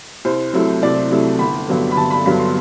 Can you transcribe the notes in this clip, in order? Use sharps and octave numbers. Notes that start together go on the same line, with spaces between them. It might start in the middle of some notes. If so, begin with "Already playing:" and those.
C2 C5
C3 F#3 A3 E4
C2 D5
C3 F#3 A3 E4
G1 B5
G2 D3 F#3 B3
B5
G1 A5
B5
G2 D3 F#3 B3 B5
C6